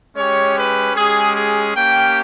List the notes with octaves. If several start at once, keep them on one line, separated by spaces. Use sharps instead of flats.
G#3 C#4 G4 C#5
B4
G#3 C#4 G4 G#4
G#4
A#3 C#4 G4 G5